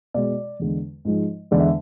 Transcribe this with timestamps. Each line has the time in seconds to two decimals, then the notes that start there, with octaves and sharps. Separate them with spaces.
0.14 B2 G#3 D5
0.60 E2 D3 G#3
1.05 G#2 F3 G#3
1.51 E2 D3 G#3 D5
1.60 E5